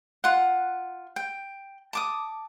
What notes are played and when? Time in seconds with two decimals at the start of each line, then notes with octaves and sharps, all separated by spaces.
0.24 F4 F#5
1.16 G5
1.93 A5 D6 D#6